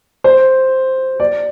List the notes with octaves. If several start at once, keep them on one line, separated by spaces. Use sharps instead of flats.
C5
D5